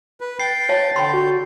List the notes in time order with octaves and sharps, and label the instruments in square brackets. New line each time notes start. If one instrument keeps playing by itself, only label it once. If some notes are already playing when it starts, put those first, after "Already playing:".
[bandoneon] B4
[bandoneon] G5 G6 [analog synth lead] A6 [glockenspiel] C7
[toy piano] C#5 F5 A5
[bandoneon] D3 G6 [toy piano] G5 B5 C6
[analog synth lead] F#4